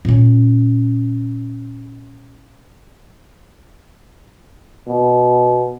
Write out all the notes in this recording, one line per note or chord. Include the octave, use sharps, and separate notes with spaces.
A#2 C#4
B2